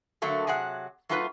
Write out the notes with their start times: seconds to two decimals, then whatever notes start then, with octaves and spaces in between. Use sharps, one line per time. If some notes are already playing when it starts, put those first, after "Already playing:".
0.22 D3 F#3 A3 A#3
0.47 C3 F#3 G#4 F#5
1.09 F#3 A3 D#4 F4 G#4 B4